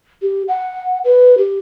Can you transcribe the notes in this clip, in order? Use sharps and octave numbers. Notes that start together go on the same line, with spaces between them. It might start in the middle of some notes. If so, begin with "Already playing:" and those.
G4
F#5
B4
G4